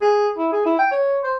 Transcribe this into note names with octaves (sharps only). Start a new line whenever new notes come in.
G#4
E4
G#4
E4
G5
C#5
C5